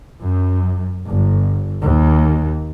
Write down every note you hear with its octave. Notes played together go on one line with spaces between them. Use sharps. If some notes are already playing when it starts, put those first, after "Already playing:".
F#2
G1
D#2